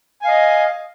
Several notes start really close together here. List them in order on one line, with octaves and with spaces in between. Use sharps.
G#5 F5 D#5